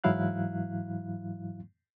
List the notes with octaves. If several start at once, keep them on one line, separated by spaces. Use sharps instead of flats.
G#2 E3 F#3 E4 F5 F#6